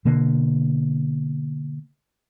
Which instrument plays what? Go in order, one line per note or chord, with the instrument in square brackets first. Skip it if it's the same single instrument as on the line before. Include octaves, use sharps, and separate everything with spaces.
[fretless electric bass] B2 D3 A#3